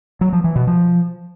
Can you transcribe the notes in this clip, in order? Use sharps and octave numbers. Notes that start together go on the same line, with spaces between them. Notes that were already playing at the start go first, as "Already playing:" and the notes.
F#3
F3
E3
B2
F3